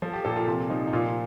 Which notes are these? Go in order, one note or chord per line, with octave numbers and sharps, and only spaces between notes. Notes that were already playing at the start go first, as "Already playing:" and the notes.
F3 A4
G4
A#2 A4
F4
C3 F4
F3 D#4
D#4
A#2 F4